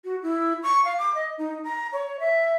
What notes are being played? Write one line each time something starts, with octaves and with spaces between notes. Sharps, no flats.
F#4
E4
C#6
F5
D6
D#5
D#4
A#5
C#5
E5